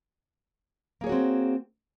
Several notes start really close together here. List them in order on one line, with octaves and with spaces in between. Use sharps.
A#3 G#4 C#5 F#4 C4